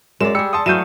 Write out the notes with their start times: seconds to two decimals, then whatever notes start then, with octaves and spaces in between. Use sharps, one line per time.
0.21 F#2 G#3 D5 E7
0.35 G3 G4 G#4 E6 C#7
0.53 A5 C6 D#6
0.66 E3 F#3 A3 F5 G6 D#7 E7